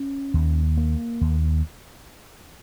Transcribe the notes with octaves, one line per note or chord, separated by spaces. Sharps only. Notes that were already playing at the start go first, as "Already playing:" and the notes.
Already playing: C#4
D#2
A#3
D#2